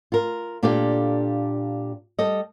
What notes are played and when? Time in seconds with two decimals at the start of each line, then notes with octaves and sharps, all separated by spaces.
0.12 F4 A#4
0.63 A#2 D4 G4 A4 D5 F5
2.19 G3 A4 D#5